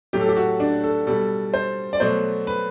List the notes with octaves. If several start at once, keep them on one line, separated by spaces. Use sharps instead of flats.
A2 F#3 A3 G4
A4
G4
F#4
D4
A4
B2 G3 A4
C5
D5
B2 F#3 A3 C5
B4